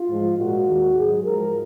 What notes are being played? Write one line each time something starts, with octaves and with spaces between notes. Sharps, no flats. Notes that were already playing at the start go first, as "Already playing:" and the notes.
Already playing: F4
G#2 F3 G#3
A#2 G#3 F#4
D#2 D#3 G#3
G#2 F#3 G#4
G#2 F3 G#3 A#4